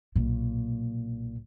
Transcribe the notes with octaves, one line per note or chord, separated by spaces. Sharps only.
B1 A#2